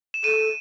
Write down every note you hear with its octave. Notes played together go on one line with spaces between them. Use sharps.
E7
A4 D#7